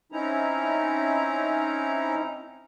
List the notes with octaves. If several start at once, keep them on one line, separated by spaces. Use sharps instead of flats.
C4 C#4 D#4 E4 A#5